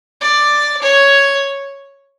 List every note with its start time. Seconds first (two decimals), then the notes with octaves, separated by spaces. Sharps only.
0.21 D5
0.82 C#5